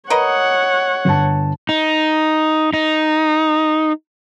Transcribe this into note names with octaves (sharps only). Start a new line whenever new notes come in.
A#4 B4 C#5 D#5 F#5
G1 A5
D#4
D#4